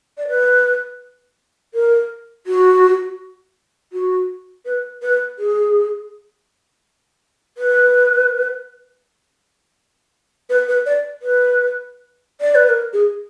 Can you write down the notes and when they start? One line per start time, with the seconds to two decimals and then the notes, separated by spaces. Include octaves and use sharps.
0.18 D5
0.28 B4
1.74 A#4
2.47 F#4
3.93 F#4
4.66 B4
5.02 B4
5.39 G#4
7.58 B4
10.50 B4
10.68 B4
10.86 D5
11.23 B4
12.41 D5
12.55 B4
12.69 A#4
12.93 G#4